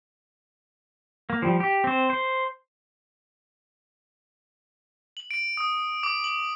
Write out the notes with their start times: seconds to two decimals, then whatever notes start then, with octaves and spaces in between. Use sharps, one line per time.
1.30 A#3
1.42 F3 G3
1.60 G4
1.84 C4 C5
2.10 C5
5.17 F#7
5.31 D7
5.57 D#6
6.03 D6
6.24 F#7